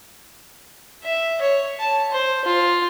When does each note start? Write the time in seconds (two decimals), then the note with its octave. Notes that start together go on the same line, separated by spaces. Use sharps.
1.04 E5
1.41 C#5
1.80 A5
2.12 C5
2.45 F4